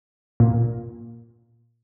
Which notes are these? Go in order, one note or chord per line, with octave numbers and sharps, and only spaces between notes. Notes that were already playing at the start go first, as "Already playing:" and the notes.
A#2